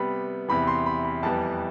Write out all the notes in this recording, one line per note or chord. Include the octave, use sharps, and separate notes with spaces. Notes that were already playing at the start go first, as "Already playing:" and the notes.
Already playing: C3 G3 B3 B5
E2 C3 E3 B5
C6
B5
B5
F2 E3 G3 B3 A5